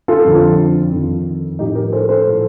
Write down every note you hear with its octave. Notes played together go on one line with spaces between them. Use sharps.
F4 A4
F2 D3 F3
F2 D#3
A2 F3 D#4 G4
G4 A#4
A4 C5
A4 C5
A2 F3